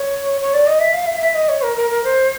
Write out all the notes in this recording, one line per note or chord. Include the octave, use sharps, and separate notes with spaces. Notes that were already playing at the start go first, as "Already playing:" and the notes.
Already playing: C#5
C#5
D5
D#5
E5
F5
E5
E5
D#5
C#5
A#4
A#4
A#4
C5